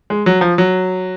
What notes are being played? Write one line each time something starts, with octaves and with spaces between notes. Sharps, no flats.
G#3
F#3
F3
F#3